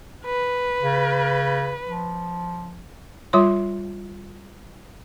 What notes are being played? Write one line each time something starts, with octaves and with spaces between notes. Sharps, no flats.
B4
C#3
F3
G3 F4 C#5 C6